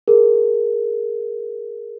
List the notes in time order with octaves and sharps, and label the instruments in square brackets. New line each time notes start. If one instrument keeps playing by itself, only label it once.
[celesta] G#4 A#4